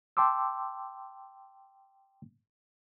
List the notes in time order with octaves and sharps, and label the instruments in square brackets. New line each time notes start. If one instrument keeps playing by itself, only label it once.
[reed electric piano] G5 A5 C6 D6 E6